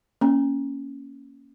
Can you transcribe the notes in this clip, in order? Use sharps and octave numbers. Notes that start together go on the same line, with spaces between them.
A#3 C#4